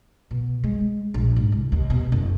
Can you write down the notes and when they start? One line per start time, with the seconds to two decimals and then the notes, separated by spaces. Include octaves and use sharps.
0.31 B2
0.64 G#3
1.14 A#1
1.36 G#2
1.52 C2
1.72 D#2
1.90 B2
2.12 F#1